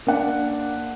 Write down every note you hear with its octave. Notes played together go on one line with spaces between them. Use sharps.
A#3 D4 F#5